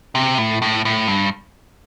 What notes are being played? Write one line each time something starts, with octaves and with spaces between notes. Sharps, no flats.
C3
A2
A2
A2
G2